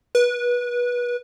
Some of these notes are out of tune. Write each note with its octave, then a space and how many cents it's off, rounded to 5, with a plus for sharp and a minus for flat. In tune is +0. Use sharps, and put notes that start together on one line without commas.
B4 -25